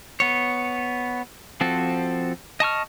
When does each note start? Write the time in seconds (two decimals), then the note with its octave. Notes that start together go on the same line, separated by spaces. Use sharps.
0.20 B3 C#5
1.61 F3 C4 F#4 A4
2.60 D#5 A5 C#6 F6